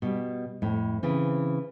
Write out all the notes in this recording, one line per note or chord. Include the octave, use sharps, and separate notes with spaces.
B2 G3
F2 A2
C#3 E3 C4